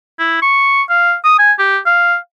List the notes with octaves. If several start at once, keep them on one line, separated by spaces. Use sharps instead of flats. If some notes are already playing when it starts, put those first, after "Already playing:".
E4
C#6
F5
D#6
G#5
G4
F5